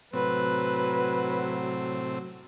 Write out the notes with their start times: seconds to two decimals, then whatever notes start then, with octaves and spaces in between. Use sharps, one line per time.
0.13 A2 C3 F#3 C4 B4